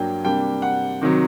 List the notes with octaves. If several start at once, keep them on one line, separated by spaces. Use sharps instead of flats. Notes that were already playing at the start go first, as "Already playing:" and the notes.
Already playing: G2 F#3 A#3 D4 G5
C3 G3 A#3 D4 G5
F#5
C3 D#3 F#3